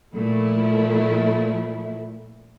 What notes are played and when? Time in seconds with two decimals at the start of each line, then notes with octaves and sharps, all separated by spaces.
0.15 A#2 F3 A3 E4